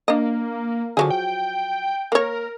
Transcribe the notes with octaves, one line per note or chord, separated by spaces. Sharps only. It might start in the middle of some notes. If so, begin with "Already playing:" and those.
A#3 D4 D#5
D3 F3 F#3 G#4
G5
A#3 A#4 C#5